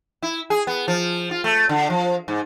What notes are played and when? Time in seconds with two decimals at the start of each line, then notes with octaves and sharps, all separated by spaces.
0.22 E4
0.50 G#4
0.67 B3
0.88 F3
1.31 F4
1.44 A3
1.69 D3
1.90 F3
2.28 G#2